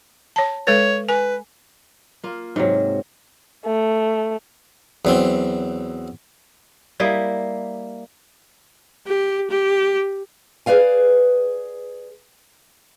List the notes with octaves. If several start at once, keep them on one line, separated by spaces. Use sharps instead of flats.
C#5 A5
G#3 A4 B4 C#5
B4 G#5
A#3 F4
G#2 C3 F#3
A3
E2 F#3 C4
G3 A#3 E4 D#5
G4
G4
G#4 B4 D5 F5 G#5